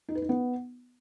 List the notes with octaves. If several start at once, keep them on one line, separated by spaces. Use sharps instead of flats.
D#4
B4
D#4
B3